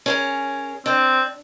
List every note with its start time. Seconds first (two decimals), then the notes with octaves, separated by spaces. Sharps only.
0.06 C#4 G#4 A#4
0.86 C4 D4